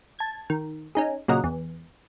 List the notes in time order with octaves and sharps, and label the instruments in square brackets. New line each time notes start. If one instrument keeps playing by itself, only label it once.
[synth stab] A5 G#6
D#3
C#4 D#4 G#4
A#2 C#3 F#3 A#4 D#5 F#5
E2